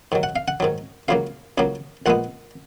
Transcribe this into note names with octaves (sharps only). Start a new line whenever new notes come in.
G#2 D#3 F#3
F#5
F5
F#5
G#2 D#3 F#3
C#2 C#3 F#3 A#3 F5
C#2 C#3 F#3 A#3
A#1 A#2 G#3 B3 F#5